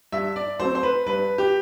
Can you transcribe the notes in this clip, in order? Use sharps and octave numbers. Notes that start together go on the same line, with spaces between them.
G2 E5
D5
F#3 A3 C4 C5
C5
B4
G2 B4
G4